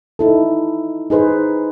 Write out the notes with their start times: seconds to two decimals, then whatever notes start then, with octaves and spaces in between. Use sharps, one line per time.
0.19 D#4 E4 A4
1.10 D#4 G#4 B4 C5